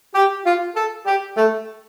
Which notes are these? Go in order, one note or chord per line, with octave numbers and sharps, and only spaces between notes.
G4
F4
A4
G4
A3